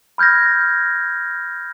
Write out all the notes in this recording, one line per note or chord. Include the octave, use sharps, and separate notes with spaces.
B5 F6 G6 G#6 A#6